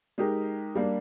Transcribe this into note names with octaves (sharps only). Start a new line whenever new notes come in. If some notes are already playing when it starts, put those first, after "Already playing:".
G#3 D#4 G4 A#4
G3 A#3 D4